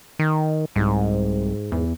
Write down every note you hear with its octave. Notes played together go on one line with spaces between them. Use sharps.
D#3
C2 G#2
E2